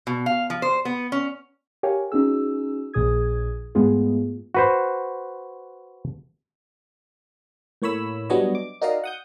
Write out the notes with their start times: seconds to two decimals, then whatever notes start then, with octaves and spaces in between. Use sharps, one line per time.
0.07 B2
0.26 F5
0.50 F3
0.62 C5
0.85 B3
1.12 C#4
1.83 G4 A#4 C#5 F5 G5 G#5
2.12 C#4 D#4 F#4 G#4 E6
2.94 A#1 A#2 G#4 D#6 G#6
3.75 G#2 G#3 A3 B3 F4 G#4
4.55 F#4 B4 C5
7.82 A2 A#3 C#5 B5 E6
8.30 F#3 G3 B3 D4 C#5 D#5
8.55 D6
8.81 D#4 F#4 A#4 D5 D#5 F5
9.04 F#5 D#6 G6